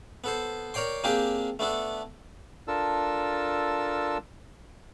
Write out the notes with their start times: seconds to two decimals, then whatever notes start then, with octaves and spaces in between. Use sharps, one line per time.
0.24 B3 A4 C5
0.74 A#4 C#5 D5 G5 C6
1.04 A#3 C4 D4 G4 G#4 G5
1.59 A3 B3 D4 A4
2.68 D4 F4 A4 A#4 A5 E6